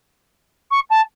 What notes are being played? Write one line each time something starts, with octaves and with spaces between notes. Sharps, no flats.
C#6
A5